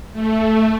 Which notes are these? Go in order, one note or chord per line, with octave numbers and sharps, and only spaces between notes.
A3